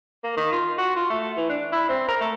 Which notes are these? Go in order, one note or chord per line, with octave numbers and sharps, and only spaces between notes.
A#3
D#3
F4
F#4
F4
A3
E3
D4
E4
C4
A#4
A3